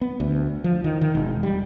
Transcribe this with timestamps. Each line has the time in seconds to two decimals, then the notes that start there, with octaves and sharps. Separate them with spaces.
0.01 B3
0.20 D2
0.64 F3
0.84 D#3
1.01 D#3
1.15 E1
1.43 G3